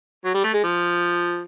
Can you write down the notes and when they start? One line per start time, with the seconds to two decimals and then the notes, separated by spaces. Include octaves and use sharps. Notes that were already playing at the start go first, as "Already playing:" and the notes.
0.25 F#3
0.34 G3
0.44 A3
0.54 G#3
0.64 F3